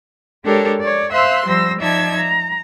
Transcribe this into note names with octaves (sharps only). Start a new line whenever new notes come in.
G#3 D4 G4 A4 A#4 C#5
C#5 D5
C5 E5 F5 C6 E6 F#6
F3 G3 C5 E6 A#6
F3 D#4 D5 E5 A5 G#6
A#5